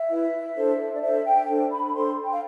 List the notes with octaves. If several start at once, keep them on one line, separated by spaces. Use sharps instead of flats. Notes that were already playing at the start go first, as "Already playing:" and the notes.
Already playing: E5
E4 B4
D4 A4 C5
D5
D4 A4 C5 E5
G5
D4 A4 C5
B5
D4 A4 C5 C6
G5
F5